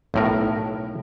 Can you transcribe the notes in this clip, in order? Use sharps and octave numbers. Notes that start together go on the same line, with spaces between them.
B1 A2 A#4